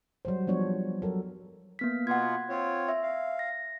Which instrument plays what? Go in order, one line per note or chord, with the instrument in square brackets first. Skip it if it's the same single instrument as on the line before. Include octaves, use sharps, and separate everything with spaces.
[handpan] F#3 G3 C5
F3 G3 B3 D4 C#5
F#3 A4 A#4
[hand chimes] A#3 B3 B6
[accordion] B2 B3 F4 [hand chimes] F#5 G#6
[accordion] C4 F4 C#5
[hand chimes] E5
[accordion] F5
[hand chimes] A#6